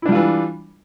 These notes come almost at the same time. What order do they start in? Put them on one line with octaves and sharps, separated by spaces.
E4 D4 G3 F4 E3